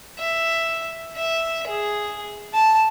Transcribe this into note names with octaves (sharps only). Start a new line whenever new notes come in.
E5
E5
G#4
A5